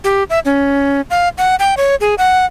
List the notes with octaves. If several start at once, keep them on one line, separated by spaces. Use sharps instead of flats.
G4
E5
C#4
F5
F#5
G5
C#5
G#4
F#5